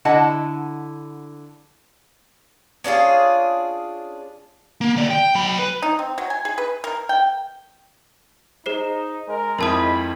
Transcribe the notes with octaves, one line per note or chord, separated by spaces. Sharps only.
D3 E4 D#5 F#5 A5
C#4 D4 F4 G#4
A#3
D#2 D5
G5
F#3 B5
B4
D#4
C4
F#3
G#5
G#4
B4
A#4
G5
D#4 G#4 C5 C7
G#3 A#4
F2 G#2 E4 A#4 A5 B5 D#6